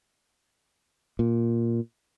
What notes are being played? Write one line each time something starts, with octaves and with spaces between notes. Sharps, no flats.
A#2